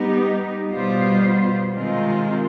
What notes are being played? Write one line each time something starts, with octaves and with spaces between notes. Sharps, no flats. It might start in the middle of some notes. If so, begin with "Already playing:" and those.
Already playing: G3 B3 D#4 G4
B2 G3 B3 F4 C5
C3 D#3 G#3 C4 F4